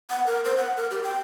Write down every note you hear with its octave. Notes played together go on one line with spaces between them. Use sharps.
F#5
A#4
C5
F#5
A#4
G4
G5